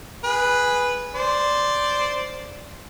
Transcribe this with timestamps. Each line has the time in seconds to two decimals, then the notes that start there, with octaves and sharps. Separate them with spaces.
0.24 G#4 B4
1.15 C5 D5